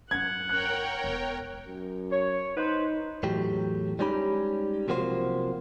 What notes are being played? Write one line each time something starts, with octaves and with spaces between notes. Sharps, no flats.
G#1 F#2 F#5 G#6
A#4 C#5 G5 F#6
E1
F#2
C#5
D#4 B4 C5
E2 A2 F#3 G4
G3 G#3 C#4 D#4 G4 B5
B1 C3 F3 A#3 F#4 C5